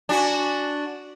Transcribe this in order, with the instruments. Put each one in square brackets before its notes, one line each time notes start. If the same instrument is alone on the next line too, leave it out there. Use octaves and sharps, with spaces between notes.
[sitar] D4 F#4 [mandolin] G#5 B5